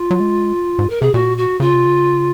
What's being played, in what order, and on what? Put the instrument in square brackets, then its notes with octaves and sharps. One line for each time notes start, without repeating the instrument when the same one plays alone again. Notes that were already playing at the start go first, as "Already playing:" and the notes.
Already playing: [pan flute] F4
[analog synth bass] F#3
G#3
G#2
[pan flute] A#4
[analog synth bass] C3 [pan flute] G#4
[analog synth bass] A#2 [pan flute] F#4
[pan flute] F#4
[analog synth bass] C#3 [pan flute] F4
[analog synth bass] C3
C#3